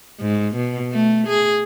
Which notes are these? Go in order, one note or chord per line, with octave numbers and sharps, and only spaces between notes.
G#2
B2
A3
G#4